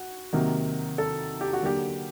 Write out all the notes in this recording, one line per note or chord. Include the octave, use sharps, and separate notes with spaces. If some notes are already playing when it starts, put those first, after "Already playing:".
Already playing: F#4
C3 D#3 F#3 A#3
A4
G4
F#4
D3 F#3 A#3 G4